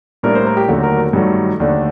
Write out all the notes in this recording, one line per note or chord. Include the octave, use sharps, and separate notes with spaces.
A2 G3 A#3 D4 A#4
C5
A#4
G4
D#2 D3 F#3 A3 F#4
A#4
G2 D#3 F#3 A3
D#2 D3 A3 D4